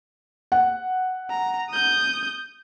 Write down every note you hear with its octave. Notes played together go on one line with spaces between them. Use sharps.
F#5
A#5
D#6 G6